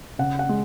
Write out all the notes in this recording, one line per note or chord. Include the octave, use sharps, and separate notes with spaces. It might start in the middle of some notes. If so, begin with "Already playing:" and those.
C#3 F#5
F#5
G#3